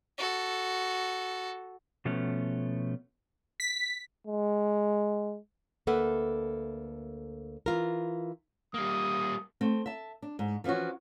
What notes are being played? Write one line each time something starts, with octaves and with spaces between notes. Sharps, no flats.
F#4 A4
B2 F3 A3 B3 C#4
B6
G#3
D2 A#3 A4 B4 E5 F#5
E3 F4 A#4
G3 A#3 D#6
A3 C4
E5 A5
D4
G#2
E3 F3 C#4 F4 F#4